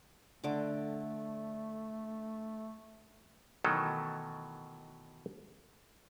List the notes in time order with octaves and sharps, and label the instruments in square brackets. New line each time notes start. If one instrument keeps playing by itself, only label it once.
[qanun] D3 D6 [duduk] A3
[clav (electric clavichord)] B2 D#3 E3 F#3 A3 A4